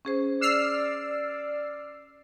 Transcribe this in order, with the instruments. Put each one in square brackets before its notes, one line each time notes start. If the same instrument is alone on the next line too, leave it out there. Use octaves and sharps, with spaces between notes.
[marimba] C#4 G#4 C5
[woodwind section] D5 [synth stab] E6 F6 C7